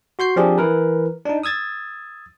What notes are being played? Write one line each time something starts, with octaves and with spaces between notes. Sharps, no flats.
F#4 C6 G6 C7
F3 C4 D4 G4 G#4
E3 A#4 B4
D4 D#4
D#6 E6 G#6 A6